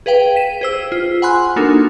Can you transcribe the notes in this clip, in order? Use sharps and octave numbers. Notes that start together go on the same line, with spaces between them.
G#4 B4 F5 G5
B6 D#7 E7
G#4 C5 E6
F4
F#5 G#5 B5 C6 F#6
A#3 D4 D#4 F#4 A4 A#4